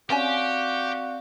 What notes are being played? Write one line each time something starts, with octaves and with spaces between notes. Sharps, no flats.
C4 C#4 F#4 G4 C#5 D5 F5 G#5